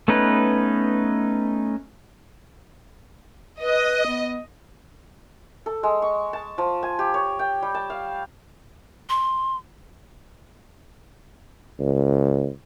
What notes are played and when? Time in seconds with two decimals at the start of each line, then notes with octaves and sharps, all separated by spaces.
0.08 A3 B3 C#4 D#4 B4
3.61 B4 D#5
4.07 B3
5.66 A4
5.83 G#3
6.02 C#6
6.33 A5
6.58 F3
6.83 G#5
6.99 G4
7.14 C#5
7.39 G5
7.62 G3
7.74 A5
7.90 F5
9.09 C6
11.80 C#2